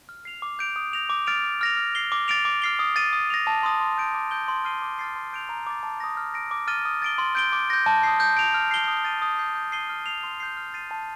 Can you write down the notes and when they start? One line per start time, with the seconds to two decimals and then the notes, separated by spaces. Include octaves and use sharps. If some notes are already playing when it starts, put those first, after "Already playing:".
0.09 F6
0.25 C7 F7
0.42 D6
0.59 G6 D7 F7
0.76 D#6
0.93 G6 A#6 F7
1.10 D6
1.27 F6 A6 D7 F7
1.43 D6
1.61 F6 A#6 F7
1.77 F6
1.95 C7 G7
2.12 D6
2.28 A6 D7 F7
2.45 D6
2.62 F6 C7 G7
2.79 D#6
2.96 A6 D#7
3.13 D#6
3.30 A#6 F7
3.47 A5
3.63 C6 D#6 A#6
3.81 C6
3.98 G6 D7
4.14 D6
4.31 G6 D7 G7
4.48 C6
4.65 F6 C7 D#7 G7
4.82 D6
4.99 F6 A6 C7
5.16 C6
5.33 G6 D7 F7
5.49 A#5
5.67 D6 A6
5.83 A5
6.00 D#6 A#6
6.17 F6
6.34 A#6 D7
6.51 D6
6.68 F6 A6 D#7 G7
6.85 D#6
7.02 A6 D7 G7
7.18 C6
7.35 G6 D7 G7
7.52 D6
7.70 G6 A#6
7.86 A5
8.03 D#6 G6 C7
8.20 G6
8.37 D7 F7
8.54 F6
8.71 C7 G7
8.88 D#6
9.05 A6 D#7
9.22 D#6
9.39 G6 C7
9.55 G6
9.72 C7 D#7 G7
9.90 F6
10.06 C7 F7
10.23 C6
10.40 G6 C7
10.57 F6
10.74 A6 C7 D#7
10.91 A5